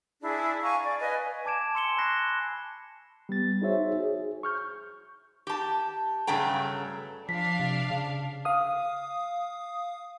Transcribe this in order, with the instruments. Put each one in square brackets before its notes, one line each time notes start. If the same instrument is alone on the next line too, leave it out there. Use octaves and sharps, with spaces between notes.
[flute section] D4 E4 G#4
F5 G#5 A#5 C#6
D5
B4 D#5 F5 G#5
[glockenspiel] G#5 A5 D6 G#6 D7 E7
A5 C6 E6 C#7 E7 G7
B5 C#6 F#6 A#6 C7
[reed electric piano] G3 B3 A6
D#4 F#4 G#4 C5 C#5 E5
G#4
C#6 F6 G6
[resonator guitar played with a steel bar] G4 A5
G2 C#3 F#3 A3 G5 A#5
[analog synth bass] F3 [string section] D4 F5 [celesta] B6
[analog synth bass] C3
C#3
[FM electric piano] F5 D#6